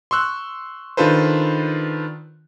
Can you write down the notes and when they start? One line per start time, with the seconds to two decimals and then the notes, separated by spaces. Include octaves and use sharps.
0.11 C6 C#6 E6 F#6
0.97 D#3 D4 F4 A4 B4 C5